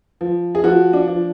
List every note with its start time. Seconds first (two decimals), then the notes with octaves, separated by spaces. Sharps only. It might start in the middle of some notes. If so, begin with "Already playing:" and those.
0.21 F3
0.55 G#4
0.64 F3 F#4
0.93 D4
1.07 F3